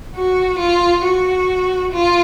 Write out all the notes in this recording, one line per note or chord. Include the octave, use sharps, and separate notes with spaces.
F#4
F4
F#4
F4